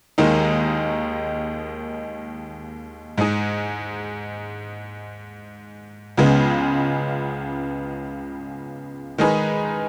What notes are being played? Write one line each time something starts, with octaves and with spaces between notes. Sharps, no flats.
D#2 D#3 G#3 D#4
G#2 G#3 D#4 G#4
C#2 C#3 G#3 B3
D#3 G#3 D#4 G#4 B4